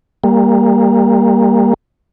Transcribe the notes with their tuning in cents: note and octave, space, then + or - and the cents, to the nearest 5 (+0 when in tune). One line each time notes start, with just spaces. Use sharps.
G3 +25 A#3 +0